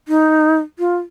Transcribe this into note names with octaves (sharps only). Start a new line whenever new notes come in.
D#4
F4